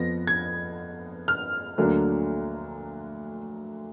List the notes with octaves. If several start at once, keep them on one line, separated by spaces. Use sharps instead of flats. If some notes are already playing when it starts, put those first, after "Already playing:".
Already playing: F2 F3 B3 A#6
G#6
F6
D2 D3 F#3 A#3 D4